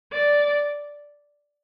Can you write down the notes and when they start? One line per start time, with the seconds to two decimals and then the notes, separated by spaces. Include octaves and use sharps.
0.12 D5